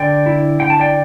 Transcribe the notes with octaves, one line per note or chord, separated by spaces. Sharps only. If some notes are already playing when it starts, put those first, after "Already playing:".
Already playing: D3 D5 G5
E4
D3 G5
A5
D5 G5